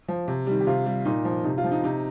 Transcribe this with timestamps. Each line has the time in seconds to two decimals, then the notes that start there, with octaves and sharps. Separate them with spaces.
0.08 F3
0.28 C3
0.47 D#3 G3
0.60 G4
0.67 C3 F4
0.86 G3
1.05 A#2 D#4
1.25 F3
1.44 C3 D#4
1.58 F4
1.64 F3
1.71 D#4
1.84 C3 D#4